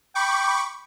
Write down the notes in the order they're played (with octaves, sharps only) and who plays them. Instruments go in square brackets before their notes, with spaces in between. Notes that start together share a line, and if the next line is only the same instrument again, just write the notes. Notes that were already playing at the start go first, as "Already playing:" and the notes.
[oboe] G5 [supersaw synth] B5 C#6 D6